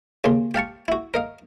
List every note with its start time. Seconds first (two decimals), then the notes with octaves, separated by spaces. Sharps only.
0.24 D#2 C#3 C6
0.54 G4 F5 A5 C#6
0.88 E4 F#4
1.14 A#4 D#5 F5